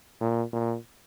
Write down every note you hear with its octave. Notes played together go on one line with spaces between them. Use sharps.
A#2
A#2